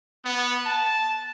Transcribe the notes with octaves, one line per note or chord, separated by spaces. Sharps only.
B3
A5